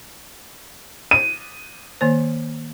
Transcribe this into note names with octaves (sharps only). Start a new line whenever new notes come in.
D#7
D#3 A#3 C5